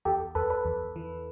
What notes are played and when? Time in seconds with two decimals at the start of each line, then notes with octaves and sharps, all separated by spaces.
0.05 E2 G4 A4
0.35 E2 A4 B4
0.50 A4 B4
0.65 E2
0.96 E3